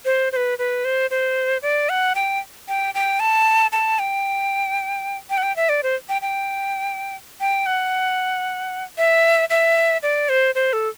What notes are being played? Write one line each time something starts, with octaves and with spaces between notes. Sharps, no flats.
C5
C5
B4
B4
C5
C5
D5
F#5
G5
G5
G5
A5
A5
G5
G5
F#5
G5
E5
D5
C5
G5
G5
G5
F#5
E5
E5
D5
C5
C5
A4